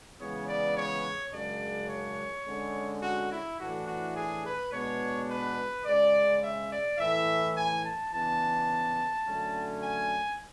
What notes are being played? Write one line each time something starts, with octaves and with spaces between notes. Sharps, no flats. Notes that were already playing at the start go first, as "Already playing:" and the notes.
C#3 E3 G#3 B3 C#5
D5
C#5
F#2 C#3 G#3 D4 D5
C#5
D3 G#3 C#4
F#4
E4
A2 E3 A3 D4 F#4
F#4
G#4
B4
B2 G#3 B3 D4 C#5
B4
C#3 G#3 C#4 D5
E5
D5
A2 E3 A3 E5
G#5
A5
C#3 E3 B3 D4 A5
F#2 D3 A3 C#4
G#5